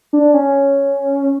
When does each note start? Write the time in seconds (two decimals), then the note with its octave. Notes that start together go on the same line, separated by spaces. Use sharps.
0.13 D4
0.34 C#4